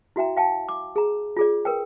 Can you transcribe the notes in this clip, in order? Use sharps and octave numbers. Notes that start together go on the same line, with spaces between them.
E4 F#4 E5 G5 A#5
F5 G5 A5
D6
G#4 A#5
F4 G#4 D5
A#4 B4 G5